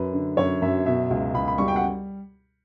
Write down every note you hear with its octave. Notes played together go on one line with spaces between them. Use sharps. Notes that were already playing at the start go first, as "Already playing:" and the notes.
Already playing: F#2 B4
D3
F#2 C#5
F#2 E5
B2 E5
C#2
C#2 B5
B5
G3 C#6
G5
F#5